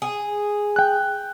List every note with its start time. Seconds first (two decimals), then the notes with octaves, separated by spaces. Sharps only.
0.02 G#4
0.76 G5 F#6